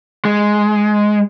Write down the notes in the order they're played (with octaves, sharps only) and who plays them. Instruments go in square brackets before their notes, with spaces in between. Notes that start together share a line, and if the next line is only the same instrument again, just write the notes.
[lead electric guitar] G#3